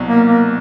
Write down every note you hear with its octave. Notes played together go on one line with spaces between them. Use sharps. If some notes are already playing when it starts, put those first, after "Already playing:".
Already playing: C2 B2 F#3
A#3
A#3